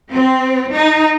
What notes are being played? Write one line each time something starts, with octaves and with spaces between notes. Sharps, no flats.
C4
D#4